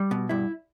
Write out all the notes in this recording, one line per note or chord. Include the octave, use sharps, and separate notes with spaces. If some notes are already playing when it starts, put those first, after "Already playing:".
Already playing: G3
B2
G2 E4